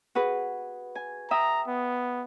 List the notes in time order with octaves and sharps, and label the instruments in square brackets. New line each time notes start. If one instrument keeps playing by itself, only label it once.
[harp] F#4 G#4 B4
G#5
[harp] E5 G5 D#6 [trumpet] A#5
[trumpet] B3